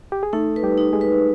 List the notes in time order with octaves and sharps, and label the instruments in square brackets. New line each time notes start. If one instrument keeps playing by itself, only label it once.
[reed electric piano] G4
G#4
[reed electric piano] A3 A4 [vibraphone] D#4
[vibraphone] B4
[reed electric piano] G3 G4
[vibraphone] D#4
[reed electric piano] G#3 G#4
[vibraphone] B4